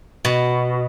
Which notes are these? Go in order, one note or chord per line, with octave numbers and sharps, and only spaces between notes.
B2